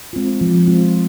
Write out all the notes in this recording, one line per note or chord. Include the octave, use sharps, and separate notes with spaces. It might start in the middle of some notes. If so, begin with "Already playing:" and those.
G#3 C4 F4
F3
G#3 C4 F4